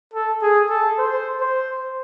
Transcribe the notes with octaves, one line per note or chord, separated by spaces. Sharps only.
A4
G#4
A4
C5
C5